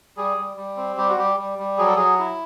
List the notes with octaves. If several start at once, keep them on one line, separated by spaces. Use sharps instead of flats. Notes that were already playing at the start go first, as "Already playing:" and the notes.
G3 G#4
G3
G3
C4
G3 G4
F#4
G3 G4
G3
G3
F#3 G#4
A4
F#3 G#4
E4